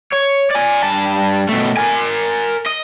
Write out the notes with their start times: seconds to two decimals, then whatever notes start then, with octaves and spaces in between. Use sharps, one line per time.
0.13 C#5
0.51 D5 G#5
0.83 G2 A5
1.49 B2 A3
1.77 A#4 G#5
2.66 D#5